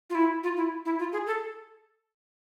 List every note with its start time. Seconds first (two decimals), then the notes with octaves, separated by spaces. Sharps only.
0.10 F4
0.15 E4
0.44 F4
0.57 E4
0.85 E4
0.99 F4
1.13 G#4
1.27 A4